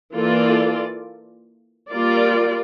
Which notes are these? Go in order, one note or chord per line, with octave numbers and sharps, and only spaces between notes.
E3 A#3 F4 A4 D5
G3 A#3 F4 A#4 D5